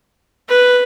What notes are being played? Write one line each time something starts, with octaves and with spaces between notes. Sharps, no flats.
B4